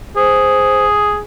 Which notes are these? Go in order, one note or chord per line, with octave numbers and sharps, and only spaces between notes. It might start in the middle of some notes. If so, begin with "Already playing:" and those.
G#4 C5